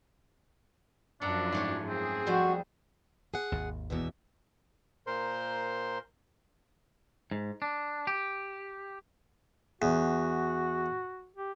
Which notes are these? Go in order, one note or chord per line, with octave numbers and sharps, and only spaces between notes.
F#2 F3 F#3 D4 A4 F#5 A#5
G#2 A3 C#5
C4 G#4
F2 G3 F#4 C5
G#4 F#5
G#1 D#2
E2 B2 E5
A#2 A#4 C5 C6
G#2
D4
G4
E2 F#4
G4